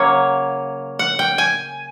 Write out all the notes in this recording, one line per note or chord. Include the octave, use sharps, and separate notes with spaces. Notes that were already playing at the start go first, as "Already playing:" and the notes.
Already playing: C#3 F#3 A#3 C#5
F#5
G5
G#5